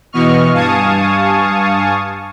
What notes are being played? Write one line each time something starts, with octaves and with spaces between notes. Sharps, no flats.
B2 E3 B3 D#5 C#6 F6
G2 F5 G#5 A5 C#6 D#6